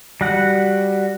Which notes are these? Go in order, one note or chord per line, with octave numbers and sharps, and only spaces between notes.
G3 F#4 F#5